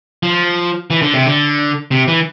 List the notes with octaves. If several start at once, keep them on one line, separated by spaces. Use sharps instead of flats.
F3
E3
D3
C3
D3
C3
E3